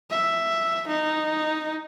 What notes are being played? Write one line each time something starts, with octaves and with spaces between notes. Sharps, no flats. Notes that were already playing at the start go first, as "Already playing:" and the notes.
E5
D#4